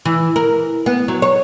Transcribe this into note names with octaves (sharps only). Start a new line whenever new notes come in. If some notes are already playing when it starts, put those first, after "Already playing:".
E3
A#4
B3
F#3
C#5